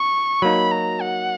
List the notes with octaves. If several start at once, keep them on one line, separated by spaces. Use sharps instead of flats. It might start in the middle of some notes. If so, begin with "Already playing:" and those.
Already playing: C#6
F#3 A#3 D#4 B5
A#5
F#5